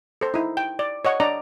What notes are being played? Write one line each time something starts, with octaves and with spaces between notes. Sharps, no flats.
A4 C5
D#4 E4
G5
D5
C#5 D#5 F#5 C#6
D4 D5 D#5 A#5